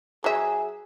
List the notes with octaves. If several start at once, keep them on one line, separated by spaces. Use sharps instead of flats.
F#3 G#4 E5